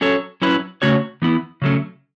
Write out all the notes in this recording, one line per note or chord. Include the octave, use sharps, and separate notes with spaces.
F#3 C#4 A4 C#5
F#3 C#4 E4 B4
C#3 A3 C#4 F#4 C#5
E3 B3 E4
C#3 F#3 A3 C#4